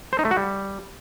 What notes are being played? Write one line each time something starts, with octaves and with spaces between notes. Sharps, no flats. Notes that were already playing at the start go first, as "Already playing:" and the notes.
C5
D#4
A3
F#4
G3